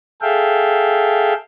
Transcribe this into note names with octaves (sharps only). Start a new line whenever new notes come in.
G#4 A4 E5 F5 G5